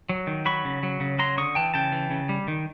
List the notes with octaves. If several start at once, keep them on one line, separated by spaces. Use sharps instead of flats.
F#3
D#3
F#3 B5 C#6
C#3
F#3
C#3
F#3 A#5 C6
D3 C#6 D#6
E3 G5 A5
C#3 G5 A5
E3
C#3
G3
D#3